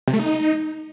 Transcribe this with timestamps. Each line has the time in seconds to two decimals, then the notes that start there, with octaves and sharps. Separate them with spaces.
0.08 C3
0.13 A3
0.19 D#4